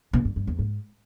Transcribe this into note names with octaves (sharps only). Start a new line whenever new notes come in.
B2
G2
G2
E2
G#2